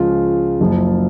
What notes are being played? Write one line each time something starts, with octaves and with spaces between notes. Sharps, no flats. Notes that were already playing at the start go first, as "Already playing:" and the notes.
Already playing: C#2 C#3 F3 F4
F#1 F#2 F3